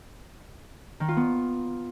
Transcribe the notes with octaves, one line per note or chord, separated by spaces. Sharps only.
D#3
F4
B3